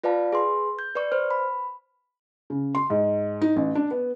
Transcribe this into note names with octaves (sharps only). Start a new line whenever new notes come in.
F4 B4 D5 F5 A5
G#4 B4 C6
G6
B4 D5 C#6
B4 C5 F6
B5
C#3
C6
G#2
D#4
A1
D4
B3